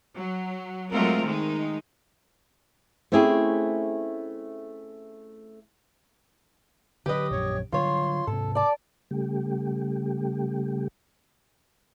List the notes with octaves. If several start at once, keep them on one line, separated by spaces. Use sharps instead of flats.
F#3
F#3 G#3 A3 C4 F4 A#4
D#3 G#3 D#4
A3 C4 C#4 E4 G4 G#4
D3 F3 F#3 G4 B4 D#5
A#1 F#2 C#5
D3 F#3 G3 F4 C#5 C6
G#2 C3 A4
D5 A5 D6
C#3 G3 A3 G4